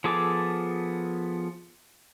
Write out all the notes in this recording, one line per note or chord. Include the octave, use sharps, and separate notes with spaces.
F3 B3 G#4 A4 D6